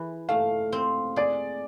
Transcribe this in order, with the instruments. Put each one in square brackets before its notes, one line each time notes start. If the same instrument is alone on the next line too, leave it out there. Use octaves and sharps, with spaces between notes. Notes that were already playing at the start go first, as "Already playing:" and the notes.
Already playing: [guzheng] E3 G#4
[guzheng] A3 [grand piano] F5
[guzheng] C4
[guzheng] G#4 [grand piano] D5